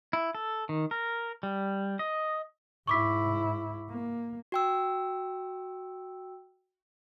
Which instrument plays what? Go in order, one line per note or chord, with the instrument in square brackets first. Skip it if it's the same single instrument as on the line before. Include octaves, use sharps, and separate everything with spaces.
[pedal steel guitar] E4
A4
D#3
A#4
G3
D#5
[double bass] G#2 E4 [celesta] C#6 D6 B6
[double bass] A#3
[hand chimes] F#4 G5 E6